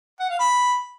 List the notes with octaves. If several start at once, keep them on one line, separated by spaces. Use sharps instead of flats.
F#5
F5
B5